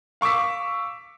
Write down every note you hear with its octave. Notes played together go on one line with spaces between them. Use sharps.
F5 C#6 D6 E6 B6